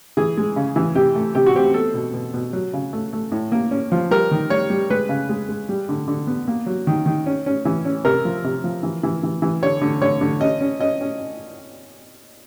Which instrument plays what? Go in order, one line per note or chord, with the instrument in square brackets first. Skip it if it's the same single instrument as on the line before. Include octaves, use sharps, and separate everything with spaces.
[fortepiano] E3 G#4
G#3
C#3
E3
C3 G4
A3
C3 G4
F#4
C4 G4
B3 A4
B2
B2
B2
F#3
C#3
A3
A3
A2
A#3
C#4
F3
G3 A#4
D#3
G3 C#5
G3
G#3 B4
C#3
G#3
G#3
G3
D3
D3
B3
A#3
F#3
D#3
D#3
C#4
C#4
E3
C#4
C3 A#4
F3
C3
F3
E3
E3
E3
E3
D3 C#5
D3
D3 C#5
D3
C#4 D#5
C#4
C#4 D#5
C#4